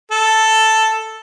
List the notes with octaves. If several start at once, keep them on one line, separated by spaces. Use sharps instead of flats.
A4